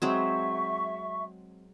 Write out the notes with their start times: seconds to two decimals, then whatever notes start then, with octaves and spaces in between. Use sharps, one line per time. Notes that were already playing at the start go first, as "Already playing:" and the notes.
0.02 F#3 G#3 C4 E5 C#6